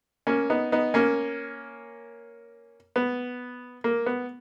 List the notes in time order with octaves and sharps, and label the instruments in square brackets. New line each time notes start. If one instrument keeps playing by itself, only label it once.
[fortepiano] A#3 C#4
B3 D#4
B3 D#4
A#3 C#4
B3
A#3
B3